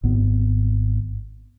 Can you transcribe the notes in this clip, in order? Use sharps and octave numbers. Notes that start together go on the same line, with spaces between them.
G#1 G#2 B3